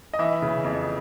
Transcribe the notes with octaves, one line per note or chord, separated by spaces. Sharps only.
D#5
E3 E5
C#3
F2